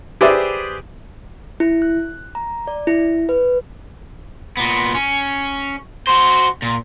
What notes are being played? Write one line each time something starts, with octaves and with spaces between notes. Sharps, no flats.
G4 G#4 B4 C5 D5 E5
E4
F#6
A#5
D5
E4
B4
A#2 B3
C#4
F#4 C5
A#2